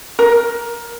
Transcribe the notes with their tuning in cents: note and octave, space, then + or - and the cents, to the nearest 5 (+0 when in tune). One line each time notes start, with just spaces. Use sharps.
A#4 +15